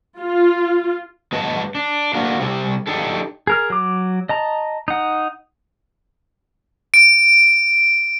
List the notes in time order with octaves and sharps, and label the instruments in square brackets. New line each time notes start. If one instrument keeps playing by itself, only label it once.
[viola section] F4
[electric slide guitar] F#3 G#3 B4 D#5 A5
D4
A3 A#3 D4 F#4 F5
C3 G3 C4
D4 D#4 G4 A4
[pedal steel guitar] G#4 A#4 F6
F#3 D6
D#5 A5 A#5
D#4 F#5
[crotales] D7